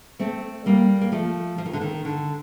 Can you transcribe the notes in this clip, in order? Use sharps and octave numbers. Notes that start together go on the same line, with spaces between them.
A3 C4
G3 A#3
A#3
F3 A3
F3
D#3
D3
D#3
D3